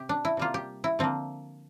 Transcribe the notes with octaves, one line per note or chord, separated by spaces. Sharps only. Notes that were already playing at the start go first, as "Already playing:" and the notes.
Already playing: C3 G4
D4
E4
C3 G3 A#3 F4
G4
E4
D3 F3 A#3 C4